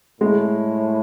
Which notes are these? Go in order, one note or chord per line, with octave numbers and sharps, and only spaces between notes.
A2 G#3